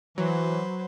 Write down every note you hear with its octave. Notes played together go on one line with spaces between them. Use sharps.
E3 F#3 B4 C5